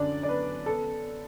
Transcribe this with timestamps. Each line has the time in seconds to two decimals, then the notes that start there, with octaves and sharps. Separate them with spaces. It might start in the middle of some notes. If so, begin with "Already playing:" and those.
Already playing: F#2 D3 D4 D5
0.23 D5
0.28 B3 B4
0.66 B3 A4